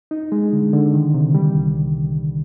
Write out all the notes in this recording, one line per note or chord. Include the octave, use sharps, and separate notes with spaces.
D#4
G#3
D3
D3
D#3
C3
G3
C2